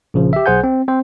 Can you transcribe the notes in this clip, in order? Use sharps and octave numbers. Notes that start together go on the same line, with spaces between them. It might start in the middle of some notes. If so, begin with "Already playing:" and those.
A#1 C#3 F3
G4 E5
B1 G#4 C5 F#5 G#5 G6
C4
C4 C5